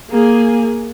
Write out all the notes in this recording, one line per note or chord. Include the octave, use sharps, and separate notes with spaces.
A#3 G#4 G#5